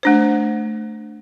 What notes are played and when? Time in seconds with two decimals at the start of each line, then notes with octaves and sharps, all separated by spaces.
0.03 A3 D4 C5